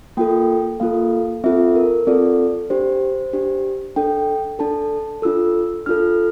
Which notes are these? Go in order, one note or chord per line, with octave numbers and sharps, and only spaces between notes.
A#3 F4 A4 G5
A#3 F4 A4 F5
C4 F4 A4 E5
A#4
C4 F4 A4 D5
D4 G4 C5
D4 G4
D4 A4 G5
D4 A4 A5
D4 F4 A4 E6
D4 F4 A4 F6